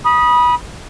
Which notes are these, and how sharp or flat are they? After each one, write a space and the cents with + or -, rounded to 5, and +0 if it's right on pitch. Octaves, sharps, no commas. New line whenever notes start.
B5 -25 D#6 +0